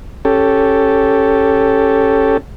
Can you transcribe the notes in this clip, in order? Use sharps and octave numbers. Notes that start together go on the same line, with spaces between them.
C#4 G4 A4